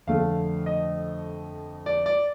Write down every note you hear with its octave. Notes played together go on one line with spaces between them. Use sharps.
F2 D3 A3 F5
D#5
D5
D5